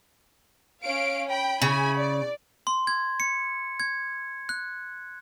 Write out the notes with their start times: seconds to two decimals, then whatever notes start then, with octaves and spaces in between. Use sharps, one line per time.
0.83 C#4 F5 D7
1.29 G5 B5
1.62 C#3 E4 G#5 B5
1.98 D5
2.67 C6
2.87 G#6
3.20 C#7
3.80 G#6
4.49 F#6